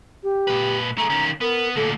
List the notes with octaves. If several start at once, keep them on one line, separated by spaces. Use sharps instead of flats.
G4
A#2 B4
A3 G#4 A#5
D#3 C#4
B3 A#4
D2 A#2 A4